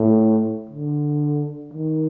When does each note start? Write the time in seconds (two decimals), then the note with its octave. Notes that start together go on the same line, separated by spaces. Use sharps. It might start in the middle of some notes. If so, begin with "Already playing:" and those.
Already playing: A2
0.69 D3
1.73 D#3